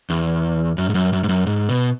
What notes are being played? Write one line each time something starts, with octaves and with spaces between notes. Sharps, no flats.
E2
F#2
G#2
F#2
F#2
G#2
F#2
G#2
B2